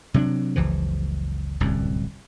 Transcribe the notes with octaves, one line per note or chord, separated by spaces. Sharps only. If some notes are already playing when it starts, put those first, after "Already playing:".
C3 F#3 G3 D4
F#1 C#2 E3 F3
D1 C2 F#2